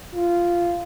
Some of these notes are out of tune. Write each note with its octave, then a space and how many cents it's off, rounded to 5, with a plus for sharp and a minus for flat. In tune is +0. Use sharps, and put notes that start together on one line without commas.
F4 -10